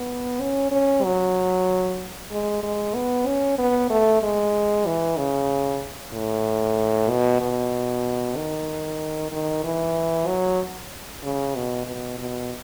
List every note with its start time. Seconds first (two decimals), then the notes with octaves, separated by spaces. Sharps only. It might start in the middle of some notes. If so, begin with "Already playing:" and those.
Already playing: B3
0.41 C#4
0.72 C#4
1.04 F#3
2.31 G#3
2.63 G#3
2.95 B3
3.27 C#4
3.59 B3
3.90 A3
4.23 G#3
4.87 E3
5.18 C#3
6.13 A2
7.09 B2
7.41 B2
8.37 D#3
9.32 D#3
9.64 E3
10.27 F#3
11.23 C#3
11.56 B2
11.87 B2
12.19 B2